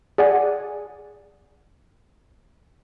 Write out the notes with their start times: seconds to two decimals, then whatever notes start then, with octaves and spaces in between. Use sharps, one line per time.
0.18 G#4 D5 F#5 G#5